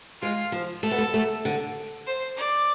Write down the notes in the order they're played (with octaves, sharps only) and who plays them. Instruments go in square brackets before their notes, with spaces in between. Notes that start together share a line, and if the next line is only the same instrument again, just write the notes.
[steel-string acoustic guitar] G#3 [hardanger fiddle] F4
[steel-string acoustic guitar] F3
[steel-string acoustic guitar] A3 [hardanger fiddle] A4
[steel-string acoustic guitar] B3
A3
A3
D3
[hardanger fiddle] C5
D5